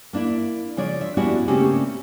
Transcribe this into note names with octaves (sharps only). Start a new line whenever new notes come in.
A#3 D4 E4
C#3 F3 D4 C#5 D5
E5
B3 C#4 D4 E4 F#4 G4
C#3 A3 A#3 C4 C#4 G4